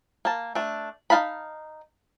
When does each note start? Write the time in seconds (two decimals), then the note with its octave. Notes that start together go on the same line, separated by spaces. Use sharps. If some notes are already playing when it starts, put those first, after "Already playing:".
0.25 A#3 A5
0.55 A3 D4
1.10 D#4 F#4 F5 A5 B5